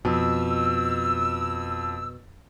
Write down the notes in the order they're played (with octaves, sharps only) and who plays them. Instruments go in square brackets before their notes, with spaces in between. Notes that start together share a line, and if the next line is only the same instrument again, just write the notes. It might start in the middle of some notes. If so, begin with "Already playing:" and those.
[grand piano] F2 [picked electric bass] B2 [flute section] E6